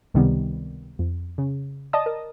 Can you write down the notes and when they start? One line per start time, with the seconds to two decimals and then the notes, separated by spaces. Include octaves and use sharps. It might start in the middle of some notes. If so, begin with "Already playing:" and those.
0.14 C#2 C3 D#3 G3 B3
0.99 F2
1.38 C#3
1.93 D5 D#5 A5 D#6
2.06 A#4